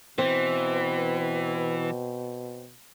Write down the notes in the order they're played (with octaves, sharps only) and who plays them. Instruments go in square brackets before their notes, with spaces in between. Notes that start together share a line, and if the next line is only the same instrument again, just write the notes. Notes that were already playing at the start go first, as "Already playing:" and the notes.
[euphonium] B2 [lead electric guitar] E3 [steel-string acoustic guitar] C4